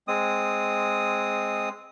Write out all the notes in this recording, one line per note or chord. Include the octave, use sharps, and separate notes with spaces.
G#3 C4 D#6